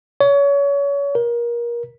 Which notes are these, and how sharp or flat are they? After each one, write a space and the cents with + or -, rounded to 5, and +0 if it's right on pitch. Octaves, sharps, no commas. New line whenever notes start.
C#5 +30
A#4 +25